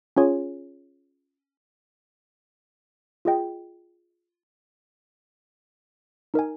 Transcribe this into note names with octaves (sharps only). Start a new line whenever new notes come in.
C#4 F4 G#4 C#5 G#5
F4 G#4 D#5 G5
D#4 A#4 D#5 G#5